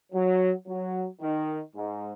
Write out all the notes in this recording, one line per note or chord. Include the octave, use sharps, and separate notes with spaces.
F#3
F#3
D#3
G#2